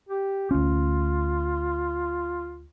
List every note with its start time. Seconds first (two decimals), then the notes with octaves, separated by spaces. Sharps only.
0.09 G4
0.51 D2 C#4 F4